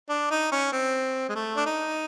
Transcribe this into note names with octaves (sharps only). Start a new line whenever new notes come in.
D4
D#4
C#4
C4
G#3
A3
D4
D#4